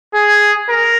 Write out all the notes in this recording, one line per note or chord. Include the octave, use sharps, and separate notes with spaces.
G#4
A#4